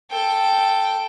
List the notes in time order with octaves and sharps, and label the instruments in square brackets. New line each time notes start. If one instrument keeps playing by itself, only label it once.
[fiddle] A4 G5